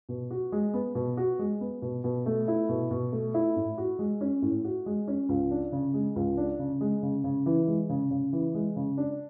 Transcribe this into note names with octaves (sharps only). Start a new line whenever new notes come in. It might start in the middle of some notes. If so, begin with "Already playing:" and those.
B2
F#4
G#3
B3
B2
F#4
G#3
B3
B2
B2
A3
E4
B2
B2
A3
E4
A2
F#4
G#3
C#4
A2
F#4
G#3
C#4
C#2
D4
C#3
G#3
C#2
D4
C#3
G#3
C#3
C#3
E3
G#3
C#3
C#3
E3
G#3
C#3
D4